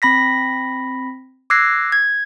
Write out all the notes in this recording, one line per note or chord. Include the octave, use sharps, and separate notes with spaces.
C4 B5 A#6 B6
D6 E6 F#6 G#6 A#6 C7
G#6